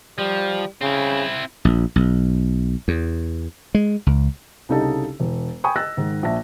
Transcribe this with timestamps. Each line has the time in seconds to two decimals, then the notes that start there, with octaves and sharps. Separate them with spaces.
0.18 F3 G3
0.81 C#3 C4 E4
1.65 A#1
1.96 B1
2.88 E2
3.75 G#3
4.07 C#2
4.69 C2 C#3 D#4 G4 A4 D#5
5.20 E1
5.64 G5 G#5 B5 C#6 D#6
5.76 D#5 E6 F#6 A6 A#6
5.97 G#2 D#3
6.23 A#1 E5 A5 A#6